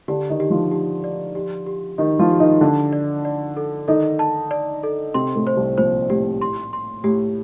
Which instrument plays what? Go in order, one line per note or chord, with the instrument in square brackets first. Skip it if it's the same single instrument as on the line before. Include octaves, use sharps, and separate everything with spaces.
[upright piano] D3 D4 [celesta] G4
[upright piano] D#3 D#4
[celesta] G4
[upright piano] F3 F4
[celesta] G4
D5
G4
G4
[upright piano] D#3 D#4 [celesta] G4
[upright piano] F3 F4
[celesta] G4
[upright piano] D#3 D#4
[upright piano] D3 D4 [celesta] A4
[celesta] D5
D5
A4
[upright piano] D#3 D#4 [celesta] A4
[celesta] A5
D5
A4
[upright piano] C3 C4 [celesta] C6
[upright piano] A2 A3
[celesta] C5
[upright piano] C2 C3
[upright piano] A#1 A#2 [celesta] C5
[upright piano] A2 [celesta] G4
[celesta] C6
C6
[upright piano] A2 [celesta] G4